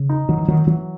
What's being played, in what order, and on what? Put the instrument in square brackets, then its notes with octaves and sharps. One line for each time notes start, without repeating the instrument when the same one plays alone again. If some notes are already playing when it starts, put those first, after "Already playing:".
Already playing: [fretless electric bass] C#3
[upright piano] D#4
[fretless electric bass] D#3 [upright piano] F#3
[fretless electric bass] E3
[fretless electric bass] D#3 [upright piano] F#3
[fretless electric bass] E3 [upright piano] F#3